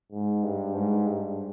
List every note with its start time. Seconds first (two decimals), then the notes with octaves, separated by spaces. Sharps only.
0.12 G#2
0.43 G2
0.74 G#2
1.06 G2